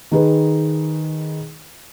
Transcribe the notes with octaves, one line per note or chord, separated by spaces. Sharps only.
D#3 D#4 G#4 B4